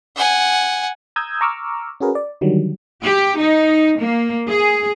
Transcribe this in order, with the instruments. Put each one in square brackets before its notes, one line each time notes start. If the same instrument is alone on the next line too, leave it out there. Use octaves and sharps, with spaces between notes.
[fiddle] F#5 G#5
[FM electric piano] A#5 D#6 E6 G6 G#6
A#5 C#6 D6 E6 F6
C#4 F#4 G#4 A#4 B4
D5
D3 D#3 F#3 G3
[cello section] G4
D#4
A#3
G#4